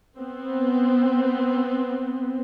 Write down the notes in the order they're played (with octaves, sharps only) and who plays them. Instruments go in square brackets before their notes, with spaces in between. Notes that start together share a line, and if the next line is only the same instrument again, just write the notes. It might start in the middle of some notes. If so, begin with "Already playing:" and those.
[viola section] B3 C4